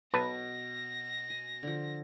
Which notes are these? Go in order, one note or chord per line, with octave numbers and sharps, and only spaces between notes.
B1 B2 B4 A5 A#6
G#5
D3 F3